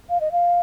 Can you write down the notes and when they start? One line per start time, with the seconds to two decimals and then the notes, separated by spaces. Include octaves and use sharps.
0.10 F5
0.21 D#5
0.32 F5